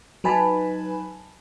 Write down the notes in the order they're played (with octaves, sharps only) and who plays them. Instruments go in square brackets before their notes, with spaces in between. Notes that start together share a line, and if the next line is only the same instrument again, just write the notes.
[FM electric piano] F#3 D#4 B4 G#5 A5 B5